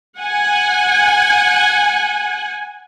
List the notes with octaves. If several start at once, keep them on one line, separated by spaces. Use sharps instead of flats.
F#5 G#5